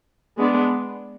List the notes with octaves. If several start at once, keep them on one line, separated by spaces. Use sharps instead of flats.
G#3 B3 D4